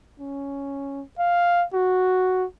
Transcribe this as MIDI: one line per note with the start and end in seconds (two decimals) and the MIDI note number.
0.20 1.03 61
1.19 1.64 77
1.74 2.45 66